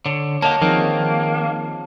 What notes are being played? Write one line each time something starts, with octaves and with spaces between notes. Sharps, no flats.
D3 C#5
A#3 G4 C#5 D#5 F#5 A5
D#3 F3 A#3 C4 G#4